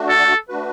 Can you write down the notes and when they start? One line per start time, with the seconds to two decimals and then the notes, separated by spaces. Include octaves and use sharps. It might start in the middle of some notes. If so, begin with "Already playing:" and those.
Already playing: A3 D4 F#4
0.09 A4
0.49 A3 D4 F#4 B4